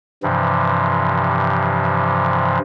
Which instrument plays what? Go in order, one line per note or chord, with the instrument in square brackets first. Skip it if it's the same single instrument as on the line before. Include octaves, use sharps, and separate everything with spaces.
[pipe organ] G2 C3 E3 F3